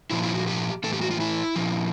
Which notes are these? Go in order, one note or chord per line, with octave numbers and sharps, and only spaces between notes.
A#2 F3 E4
E4
F#4
G4
A2 E3 A4
G4
F#4
F4
E4
A#2 F3